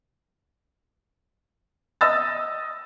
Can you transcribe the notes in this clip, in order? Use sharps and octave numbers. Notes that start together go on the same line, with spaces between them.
D#5 E6 A6